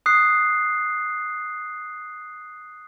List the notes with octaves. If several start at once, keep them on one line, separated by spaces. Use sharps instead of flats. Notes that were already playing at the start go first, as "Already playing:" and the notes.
D#6 F#6 C7